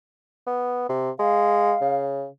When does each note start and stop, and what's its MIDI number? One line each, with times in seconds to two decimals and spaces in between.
0.47 0.87 59
0.89 1.11 48
1.19 1.75 56
1.19 2.04 77
1.81 2.27 49